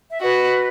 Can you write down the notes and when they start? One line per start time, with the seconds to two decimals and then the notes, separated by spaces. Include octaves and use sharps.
0.10 E5
0.21 F#4 B4 D#5